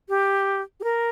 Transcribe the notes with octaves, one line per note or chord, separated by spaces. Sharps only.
G4
G4
A#4